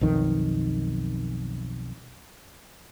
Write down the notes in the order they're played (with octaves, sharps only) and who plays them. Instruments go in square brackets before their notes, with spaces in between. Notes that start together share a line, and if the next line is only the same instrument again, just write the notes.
[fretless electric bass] B1 F2 D#3